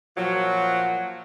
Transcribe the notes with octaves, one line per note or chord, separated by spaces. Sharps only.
A#2 F3 F#3